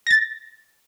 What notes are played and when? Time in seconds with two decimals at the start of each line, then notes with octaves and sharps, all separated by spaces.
0.07 A6 A#6